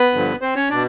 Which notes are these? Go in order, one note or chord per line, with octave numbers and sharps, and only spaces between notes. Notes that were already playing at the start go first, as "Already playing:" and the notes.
Already playing: B3 B4
G2 D3 F3
C4 C5
C#4 C#5
B2 D4 D5